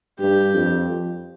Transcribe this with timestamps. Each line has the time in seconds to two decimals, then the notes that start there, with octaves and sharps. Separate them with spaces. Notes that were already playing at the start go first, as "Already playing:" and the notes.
0.19 G2 G4
0.54 F2